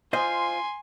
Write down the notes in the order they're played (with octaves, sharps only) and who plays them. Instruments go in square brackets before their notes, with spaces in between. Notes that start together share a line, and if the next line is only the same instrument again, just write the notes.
[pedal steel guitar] F4 [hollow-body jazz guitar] C5 D#5 [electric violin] G#5 [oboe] C6